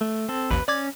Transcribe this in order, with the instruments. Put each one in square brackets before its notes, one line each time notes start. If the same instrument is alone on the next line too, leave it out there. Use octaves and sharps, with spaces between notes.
[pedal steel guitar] A3
C4 A4
[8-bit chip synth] A1 D#2 [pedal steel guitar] B4
[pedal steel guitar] C#4 [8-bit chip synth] D5 D6 G#6